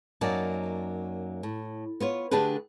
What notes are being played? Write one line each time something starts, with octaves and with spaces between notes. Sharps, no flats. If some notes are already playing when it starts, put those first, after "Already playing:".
F#2 F#3 A#3 D#4 D5 A5
A2
B3 F4 C#5
D3 A3 D4 G4 G#4 B4